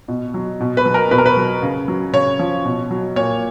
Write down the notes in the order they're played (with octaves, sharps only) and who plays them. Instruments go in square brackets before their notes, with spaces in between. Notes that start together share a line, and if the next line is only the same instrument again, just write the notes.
[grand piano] B2
F#3
B2
B4
F#3
A#4
B2 B4
A#4
B4
F#3
C#3
F#3
C#3 C#5
F3
B2
F#3
A#2 C#5